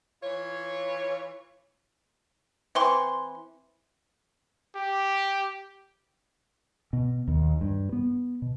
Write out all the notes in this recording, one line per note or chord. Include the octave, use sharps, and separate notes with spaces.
E3 F4 C#5
E3 C4 C6 C#6
G4
B2
D#2
G2
B3
B2